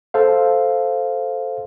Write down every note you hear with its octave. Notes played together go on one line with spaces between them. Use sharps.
A4 C5 F5